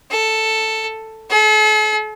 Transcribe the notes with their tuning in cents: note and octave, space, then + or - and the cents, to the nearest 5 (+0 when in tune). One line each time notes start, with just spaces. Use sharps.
A4 +5
A4 -45